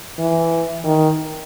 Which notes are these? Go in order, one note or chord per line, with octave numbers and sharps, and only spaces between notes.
E3
D#3